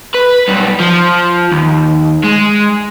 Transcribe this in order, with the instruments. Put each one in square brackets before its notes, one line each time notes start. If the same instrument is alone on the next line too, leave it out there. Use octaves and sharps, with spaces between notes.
[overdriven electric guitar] B4
B1 G3
F3
D#2
G#3